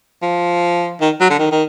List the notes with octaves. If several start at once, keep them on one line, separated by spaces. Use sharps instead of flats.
F3
D#3
F#3
D3
D#3
D#3